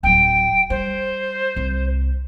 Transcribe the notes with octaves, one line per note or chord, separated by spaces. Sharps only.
D1 F#3 G5
G3 C5
C2